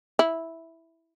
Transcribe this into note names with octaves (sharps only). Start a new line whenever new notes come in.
E4